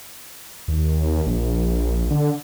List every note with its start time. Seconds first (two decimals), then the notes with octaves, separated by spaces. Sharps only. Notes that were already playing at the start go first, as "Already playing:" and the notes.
0.68 D#2
1.27 A#1
2.10 D3